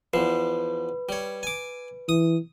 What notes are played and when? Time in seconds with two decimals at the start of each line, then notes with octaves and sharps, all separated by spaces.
0.13 E2 F3 B4
1.09 G3 C#5
1.43 G#5 D6
2.09 E3 D#6